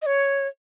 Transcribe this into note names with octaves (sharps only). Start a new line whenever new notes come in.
D#5
C#5